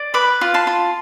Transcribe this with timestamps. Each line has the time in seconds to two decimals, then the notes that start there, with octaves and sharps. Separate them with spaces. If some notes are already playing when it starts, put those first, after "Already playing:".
Already playing: D5
0.14 B4 B5 D6
0.41 F4
0.54 A5 C6
0.67 F4